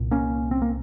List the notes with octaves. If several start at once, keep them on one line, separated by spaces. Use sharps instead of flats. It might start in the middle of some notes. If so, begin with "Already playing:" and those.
Already playing: C2 A#2
A#3 C#4
C4
A#3